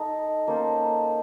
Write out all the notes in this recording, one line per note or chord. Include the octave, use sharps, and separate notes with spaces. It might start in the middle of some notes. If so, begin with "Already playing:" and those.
Already playing: D#4 A4 D#5
A#3 C#4 A4 C5